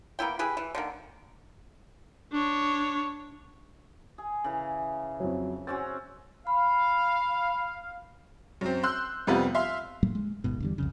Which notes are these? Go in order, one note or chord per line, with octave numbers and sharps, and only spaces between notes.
A#3 B3 E4 G5
E4 G4 G#4 B4
E3
D3 D#3 A#3
D4 C#5
G#4
C#3 E3
F2 F#3
C4 C#4 F#4 A6
F5 B5
F#2 C4
C6 E6 F#6 G6
F2 C3 G3 B3 C4 F4
E5 F5 C6
A2 F#3 G3 A#3
G#3
D1 G1 G#2 B2
E2 D3 G3
C2 F2 C#3